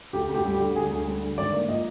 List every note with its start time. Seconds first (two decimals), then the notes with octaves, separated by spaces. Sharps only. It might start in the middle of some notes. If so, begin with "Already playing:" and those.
0.13 D2 G4
0.29 D2
0.35 G4
0.45 G3
0.54 G4
0.60 D3
0.76 D2 G#4
0.91 D2
1.07 G3
1.22 D3
1.37 G#1 D5
1.54 A#3
1.69 F3 D#5